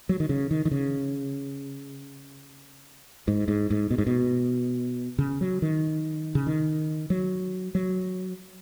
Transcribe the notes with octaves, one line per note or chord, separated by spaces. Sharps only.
F#3
D#3
C#3
D#3
D#3
C#3
G#2
G#2
G#2
B2
G#2
B2
C#3
F#3
D#3
C#3
D#3
F#3
F#3